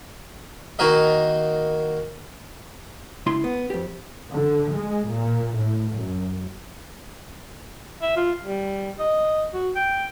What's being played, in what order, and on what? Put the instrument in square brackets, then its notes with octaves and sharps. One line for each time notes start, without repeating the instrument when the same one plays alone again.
[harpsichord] D#3 A#3 D#4 F#4 A#4 D#5
[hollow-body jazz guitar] C#2 E4 C6
B3
F2 G4
[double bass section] D3
G#3
A#2
A2
F#2
[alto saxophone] E5
F4
G3
D#5
F#4
G5